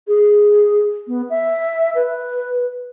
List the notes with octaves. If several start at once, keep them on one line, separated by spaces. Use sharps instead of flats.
G#4
B3
E5
B4